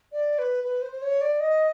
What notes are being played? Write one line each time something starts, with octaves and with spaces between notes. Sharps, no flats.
D5
B4
B4
C5
C5
C#5
D5
D#5